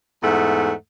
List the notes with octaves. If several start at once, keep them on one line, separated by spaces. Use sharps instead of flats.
E2 G#2 A3 F#5